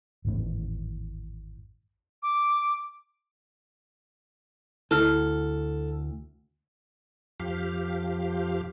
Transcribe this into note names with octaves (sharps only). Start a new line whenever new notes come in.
G#1 E2 A2
D6
D2 E4 A4 F6
F2 F3 G4 F5